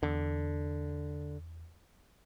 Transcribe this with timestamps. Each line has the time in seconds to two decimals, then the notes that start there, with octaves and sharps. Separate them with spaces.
0.03 E2 D3